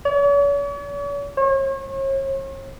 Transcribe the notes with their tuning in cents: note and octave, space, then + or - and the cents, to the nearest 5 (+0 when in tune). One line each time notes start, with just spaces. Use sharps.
C#5 +45
C#5 -40